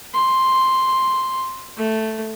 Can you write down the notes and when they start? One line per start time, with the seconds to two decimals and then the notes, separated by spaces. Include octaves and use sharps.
0.14 C6
1.77 A3